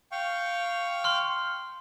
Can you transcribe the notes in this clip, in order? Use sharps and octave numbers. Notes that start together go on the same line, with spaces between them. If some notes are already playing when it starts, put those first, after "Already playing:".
F5 G5 C#6
C6 F6